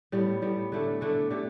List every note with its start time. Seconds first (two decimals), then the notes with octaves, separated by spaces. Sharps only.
0.12 A2 G3 B3
0.42 A2 G3 B3
0.72 D3 A3 D4 A4
1.01 D3 A3 D4 A4
1.30 D3 A3 G4